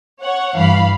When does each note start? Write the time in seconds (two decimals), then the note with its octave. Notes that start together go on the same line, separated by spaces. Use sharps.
0.21 C#5 F#5
0.58 G2 E3 F5 B5